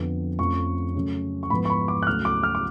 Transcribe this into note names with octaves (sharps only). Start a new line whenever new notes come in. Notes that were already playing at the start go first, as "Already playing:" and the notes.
Already playing: F2 D3 F3 B3
F2 F3 A3 C#4 C#6
C#3 F#3 A3 C#4
C#6
G#2 F3 B3 B5
C#6
B5
D6
F#6
D2 C#3 F#3 A3 F6
D6
F6
D6